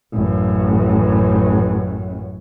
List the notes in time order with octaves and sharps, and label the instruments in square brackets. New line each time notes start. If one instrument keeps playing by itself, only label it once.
[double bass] A1 F#2